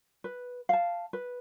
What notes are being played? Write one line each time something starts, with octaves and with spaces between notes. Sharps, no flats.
B4
F5 A5
B4